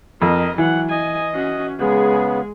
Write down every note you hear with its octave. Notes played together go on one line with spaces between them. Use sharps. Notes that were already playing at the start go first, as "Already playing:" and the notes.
F2 A#4 D#5
E3 F#3 F#5
D#5 G#5 D#6
C#4 F#4
C#3 G#3 B3 G#4